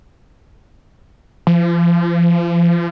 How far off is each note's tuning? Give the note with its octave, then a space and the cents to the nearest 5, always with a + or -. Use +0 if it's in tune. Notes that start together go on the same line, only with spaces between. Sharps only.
F3 -35